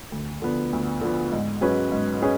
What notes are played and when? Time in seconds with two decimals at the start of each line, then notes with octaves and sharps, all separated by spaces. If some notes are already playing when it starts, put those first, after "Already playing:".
0.12 D2
0.42 D3 F3 B3
0.73 D2
1.01 D3 F3 B3
1.32 G#2
1.61 F#3 C#4 G#4 B4
1.92 G#2
2.22 C#4 G#4 B4